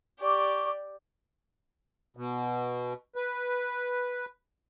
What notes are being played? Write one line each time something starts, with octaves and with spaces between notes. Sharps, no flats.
G4 D5 C#6 D6
B2
B4